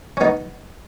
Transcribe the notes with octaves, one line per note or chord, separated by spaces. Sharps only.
C#4
B3 D#4